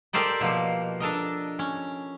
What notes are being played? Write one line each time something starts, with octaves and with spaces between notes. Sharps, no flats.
G4 A4 A#4 C5 D5 D#5
B2 F3 A#3
D4 A4 A#4 D#5
C#4